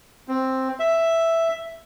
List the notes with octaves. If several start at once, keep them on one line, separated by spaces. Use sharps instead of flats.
C4
E5